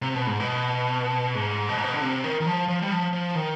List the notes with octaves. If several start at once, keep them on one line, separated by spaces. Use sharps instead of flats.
C3
B2
G#2
B2
G#2
B2
G#2
B2
D3
C3
D#3
D#3
F3
F3
G3
F3
F3
D#3